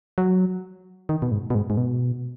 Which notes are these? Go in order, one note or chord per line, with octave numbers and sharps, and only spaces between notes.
F#3
D#3
B2
G#2
B2
G#2
G#2
B2